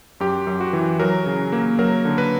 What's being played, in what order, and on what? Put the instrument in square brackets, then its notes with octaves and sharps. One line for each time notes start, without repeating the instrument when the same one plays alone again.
[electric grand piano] F#2 G4
F#2
F#4
E3
F#3 A#4
C#3
A#3
F#3 A#4
D3
B4